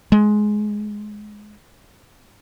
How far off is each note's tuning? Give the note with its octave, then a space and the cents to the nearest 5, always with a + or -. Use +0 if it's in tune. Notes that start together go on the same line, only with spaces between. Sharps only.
G#3 +15